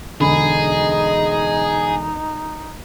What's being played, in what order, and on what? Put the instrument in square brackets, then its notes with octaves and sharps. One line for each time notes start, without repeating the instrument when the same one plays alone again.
[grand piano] E1 D3 B5 [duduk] D#4 [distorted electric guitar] G#4 [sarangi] D#5